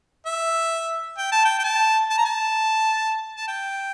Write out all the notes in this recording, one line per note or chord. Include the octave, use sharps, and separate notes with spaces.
E5
G5
A5
G5
G5
A5
A5
A#5
A5
A5
G5